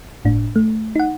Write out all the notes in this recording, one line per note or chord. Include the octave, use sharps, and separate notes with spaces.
G1 A2 D4
A3
D#4 F#5